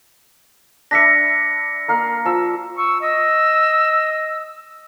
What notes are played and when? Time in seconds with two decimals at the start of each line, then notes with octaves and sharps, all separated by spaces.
0.91 D4 E5 B5 A#6 B6 C#7
1.88 A#3 A#4 F5
2.25 F3 E6
2.78 C#6 E6
3.02 D#5 E6